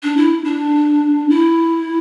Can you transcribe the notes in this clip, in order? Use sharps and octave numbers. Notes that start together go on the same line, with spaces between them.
D4
E4
D4
E4